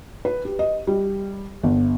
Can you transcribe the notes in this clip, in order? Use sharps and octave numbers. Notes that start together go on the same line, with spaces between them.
B4
G4
D#5
G3
G1